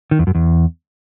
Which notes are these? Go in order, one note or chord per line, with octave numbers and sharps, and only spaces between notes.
D#3
E2
F#2
E2